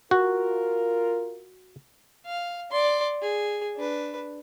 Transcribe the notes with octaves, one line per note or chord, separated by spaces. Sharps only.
F4 F#4 A#4
F5
D5 C6
G#4
D4 B4